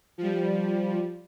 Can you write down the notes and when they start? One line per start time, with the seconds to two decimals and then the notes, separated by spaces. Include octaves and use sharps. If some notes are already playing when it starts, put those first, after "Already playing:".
0.18 F3 G3